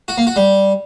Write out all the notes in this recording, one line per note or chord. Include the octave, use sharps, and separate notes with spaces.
F#4
A#3
F#4
G3